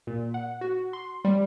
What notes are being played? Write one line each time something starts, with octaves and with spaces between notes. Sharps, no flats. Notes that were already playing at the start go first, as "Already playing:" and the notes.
A#2
F#5
F#4
C6
G3